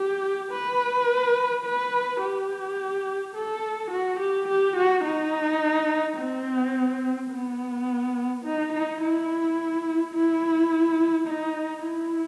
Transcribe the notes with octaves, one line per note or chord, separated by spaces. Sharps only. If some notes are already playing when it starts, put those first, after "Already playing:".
Already playing: G4
B4
B4
G4
A4
F#4
G4
G4
F#4
D#4
C4
B3
D#4
D#4
E4
E4
D#4
E4